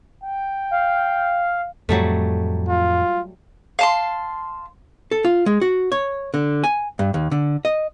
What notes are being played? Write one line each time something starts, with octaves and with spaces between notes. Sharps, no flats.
G5
F5
F2 A2 F#3 G3 A3
F4
F5 A5 C6
A4
F4
G#3
F#4
C#5
D3
G#5
G2
D#2
D3
D#5